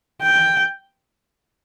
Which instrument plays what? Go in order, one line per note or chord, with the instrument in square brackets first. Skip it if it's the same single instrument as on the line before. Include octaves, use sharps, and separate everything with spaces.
[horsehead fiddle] G5